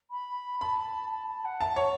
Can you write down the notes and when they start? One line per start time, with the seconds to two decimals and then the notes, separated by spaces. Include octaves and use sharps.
0.10 B5
0.61 A5 B5
1.11 A5
1.28 A5
1.45 F#5
1.61 E5 A5
1.73 C#5 F#5